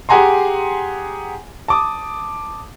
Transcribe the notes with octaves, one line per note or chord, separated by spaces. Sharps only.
G4 G#4 F#5 G#5 A#5 C6
A5 D6 D#6